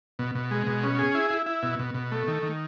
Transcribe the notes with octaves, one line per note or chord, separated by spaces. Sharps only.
B2
B2
G#3
B2
C#4
G#4
E4
E4
E4
B2
B2
B2
A3
D#3
D#3